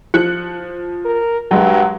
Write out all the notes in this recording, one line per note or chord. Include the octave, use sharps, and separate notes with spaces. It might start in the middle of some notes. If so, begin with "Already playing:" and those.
F3 F#6 C#7
A#4
G2 F#3 G#3